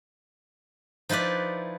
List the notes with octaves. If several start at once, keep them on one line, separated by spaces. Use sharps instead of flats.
F3 D#4 E4 B4 D5